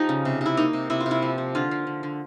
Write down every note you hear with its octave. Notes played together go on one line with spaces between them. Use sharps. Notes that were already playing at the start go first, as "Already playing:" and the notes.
Already playing: F3 D#4 G4
C#3
C3
C3 E4
A#3 D#4
C3
C3 E4
F4
C3
E4
F3
F3
D3 F4
F3
D3
D3